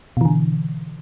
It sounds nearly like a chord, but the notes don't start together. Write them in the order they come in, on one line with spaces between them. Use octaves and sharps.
B2 E3 D3